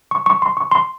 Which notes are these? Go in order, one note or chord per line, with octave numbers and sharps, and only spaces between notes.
C#6
C#6
C6
C#6
C6